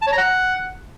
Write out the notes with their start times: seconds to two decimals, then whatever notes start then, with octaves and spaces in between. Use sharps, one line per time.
0.02 A5
0.07 C#5
0.12 A#5
0.18 F#5